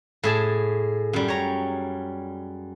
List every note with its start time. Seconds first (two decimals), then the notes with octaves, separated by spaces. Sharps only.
0.24 A2 G#4 A5
1.13 F#2 G3
1.28 C#5 A#5